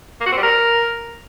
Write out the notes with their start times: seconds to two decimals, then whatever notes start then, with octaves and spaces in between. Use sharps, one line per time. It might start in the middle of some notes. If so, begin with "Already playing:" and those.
0.21 A#3
0.26 F#4
0.32 C4
0.37 G3
0.43 A#4